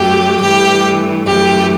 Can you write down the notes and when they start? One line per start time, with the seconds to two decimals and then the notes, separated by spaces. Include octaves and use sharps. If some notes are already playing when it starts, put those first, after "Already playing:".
Already playing: F#2 F#3 A3 G4
0.42 G2 E3 A3 G4
1.27 F#2 E3 A3 G4